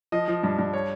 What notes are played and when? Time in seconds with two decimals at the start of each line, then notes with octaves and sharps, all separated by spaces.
0.12 F3 D#5
0.28 F3
0.43 G2
0.58 G2
0.73 C#5